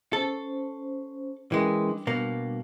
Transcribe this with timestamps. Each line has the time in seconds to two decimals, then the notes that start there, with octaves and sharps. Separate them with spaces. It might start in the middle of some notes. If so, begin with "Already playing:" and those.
0.13 C#4 A4 C5
1.52 E3 G#3 C#4 A#4 G5
1.88 G3 D4
2.07 B2 A#3